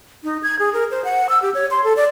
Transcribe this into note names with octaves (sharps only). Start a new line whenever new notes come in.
D#4
G#6
G#4
A#4
C5
F#5
E6
G4
C#5
C6
A4
D5